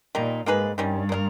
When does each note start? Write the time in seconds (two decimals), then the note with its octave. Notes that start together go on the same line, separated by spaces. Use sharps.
0.15 A#2 D#3 G3 A#3 D#4
0.46 G#2 A#3 D#4 G#4 B4
0.78 G2 D#3 G3 C#4
1.09 A#3 D#4 A#4